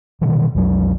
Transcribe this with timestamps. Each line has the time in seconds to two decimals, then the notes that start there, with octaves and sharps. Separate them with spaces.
0.21 B2 D#3 E3
0.55 B1 F2 F#3